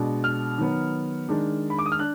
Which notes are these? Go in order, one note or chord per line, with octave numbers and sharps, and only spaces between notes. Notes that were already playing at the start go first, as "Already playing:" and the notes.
Already playing: B2 G#3 D4
F6
D#3 F#3 B3
D#3 G#3 D4
B5
D6
D#6
F6
D4 F#6